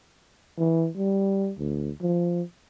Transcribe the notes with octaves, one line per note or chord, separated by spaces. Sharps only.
E3
G3
D2
F3